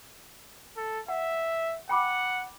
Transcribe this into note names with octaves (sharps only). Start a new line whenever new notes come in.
A4
E5 F#5
F#5 G5 B5 D6